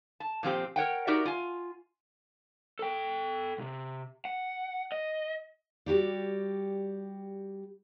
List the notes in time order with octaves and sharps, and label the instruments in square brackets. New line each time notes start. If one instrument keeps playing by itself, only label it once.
[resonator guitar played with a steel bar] A5
A#2 F3 C4 G4
A#4 C#5 F#5 G5
D#4 F#4 G4 A#4 D5 E5
F4 G#5
[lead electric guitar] A4 G5
B1 C3
F#5
D#5
[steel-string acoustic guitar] G3 F#4 G4 D5